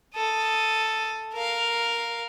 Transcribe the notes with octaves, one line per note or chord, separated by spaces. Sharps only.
A4 D#6
A#4 F5